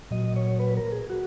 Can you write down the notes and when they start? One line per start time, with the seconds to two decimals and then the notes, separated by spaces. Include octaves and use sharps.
0.11 A#2 F#3 D#5
0.36 C#5
0.60 B4
0.77 A#4
0.92 G#4
1.10 F#4